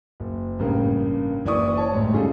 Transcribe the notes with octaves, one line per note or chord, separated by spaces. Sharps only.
F#1
A1 G2 C#3 A#3 A#4
F#1 E3 E4 D5 C#6 D#6
C#5 A5
A1 D2 G#2
C#3 G3 F4 G#4 A4